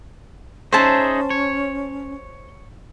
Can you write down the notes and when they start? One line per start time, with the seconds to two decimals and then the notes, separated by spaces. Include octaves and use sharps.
0.73 C#4 D#4 G#4 C5 E5 A5
1.30 C#5